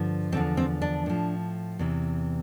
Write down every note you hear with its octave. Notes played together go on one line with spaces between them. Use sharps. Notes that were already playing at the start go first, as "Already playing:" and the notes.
Already playing: G2 D3 F3
E2 D3 F3 C4
C4
D4
A2 F3
E2 C3 E3